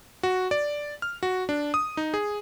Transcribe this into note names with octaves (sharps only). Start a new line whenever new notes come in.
F#4
D5
F6
F#4
D4
D#6
D#4
G#4